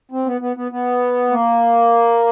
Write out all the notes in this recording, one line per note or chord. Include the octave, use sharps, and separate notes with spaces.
C4
B3
B3
B3
B3
A#3